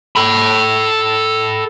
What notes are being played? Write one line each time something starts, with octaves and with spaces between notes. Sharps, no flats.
A4 B5